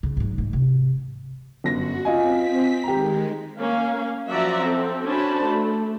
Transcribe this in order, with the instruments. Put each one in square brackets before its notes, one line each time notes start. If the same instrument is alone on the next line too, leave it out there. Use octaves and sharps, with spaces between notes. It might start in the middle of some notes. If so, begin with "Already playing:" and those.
[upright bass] C#3 F3
G#2 F#3
G#2
C3
[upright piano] G1 F#2 A#6 [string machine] F#4
[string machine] C4 B6 [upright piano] F4 D#5 G#5
[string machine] D#3 G#3 [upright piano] G4 A#5
[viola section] A#3 C#4 F5
F3 F#3 D5 E5 F#5 A#5
C4 A4
C#4 D4 F#4 C5 A5 B5
A3